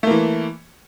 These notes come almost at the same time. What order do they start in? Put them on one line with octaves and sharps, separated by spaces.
A3 A#3 E3